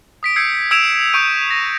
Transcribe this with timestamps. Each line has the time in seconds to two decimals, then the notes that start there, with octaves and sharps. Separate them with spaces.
0.23 D#6 B6 D7
0.36 E6 G6 G#6 C7 C#7
0.71 E6 G#6 D7 E7 F7
1.13 C#6 D#6 E6 G6 D7 D#7
1.50 A#6